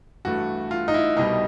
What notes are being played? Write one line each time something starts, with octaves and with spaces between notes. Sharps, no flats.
G2 E3 A3 F#4
F4
D#4
E4
C2 B2 G3 D#4